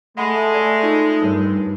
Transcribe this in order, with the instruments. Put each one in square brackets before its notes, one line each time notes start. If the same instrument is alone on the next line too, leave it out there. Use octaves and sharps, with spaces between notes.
[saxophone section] G#3 [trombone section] A3 [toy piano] F#5 B5
[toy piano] D5 G#5
D#4 F4
[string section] G2 [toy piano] A#4 C#5